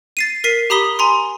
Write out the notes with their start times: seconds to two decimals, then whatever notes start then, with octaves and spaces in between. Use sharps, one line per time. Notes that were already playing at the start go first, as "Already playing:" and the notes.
0.17 A6 C7 D#7
0.44 A#4 B6 C7 D#7
0.70 G4 A#5 B5 D#6 B6 G7
0.99 G#5 A#5 C6